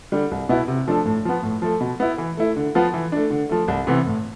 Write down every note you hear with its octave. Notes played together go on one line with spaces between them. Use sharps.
D3 G3
C2
B2 B3 E4
C3
F3 A3 D4 A4
A2
F3 B3
A2
F3 A3
B2
B3 E4
E3
A3 E4
D3
F3 B3 F4
E3
A3 D4
D3
F3 A3
C2
C3 E3 B3
A2